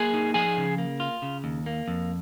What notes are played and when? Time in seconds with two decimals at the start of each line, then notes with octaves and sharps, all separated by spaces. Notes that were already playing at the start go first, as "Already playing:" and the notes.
Already playing: A#3 G#4 G#5
0.14 D#4
0.34 F3 G#4 G#5
0.57 C#3
0.78 A#3
1.00 F4
1.22 C#3
1.44 D#2
1.66 A#3
1.88 F2